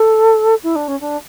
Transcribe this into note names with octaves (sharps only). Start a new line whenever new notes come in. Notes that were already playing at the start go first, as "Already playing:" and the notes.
Already playing: A4
E4
D4
C#4
D4